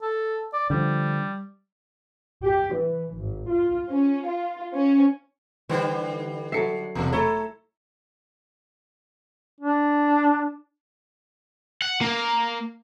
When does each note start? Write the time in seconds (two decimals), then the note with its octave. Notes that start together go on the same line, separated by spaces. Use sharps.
0.02 A4
0.53 D5
0.70 D3 F3 G3
2.44 G4
2.74 E3
3.14 G#1
3.50 F4
3.89 C#4
4.26 F4
4.75 C#4
5.69 D3 E3 G3 E4 C5
6.52 F#3 A4 E5 C7 C#7
6.95 E1 A2 C3
7.12 A3 E4 A4 C#5 A#5 B5
9.60 D4
11.82 F#5
12.01 A#3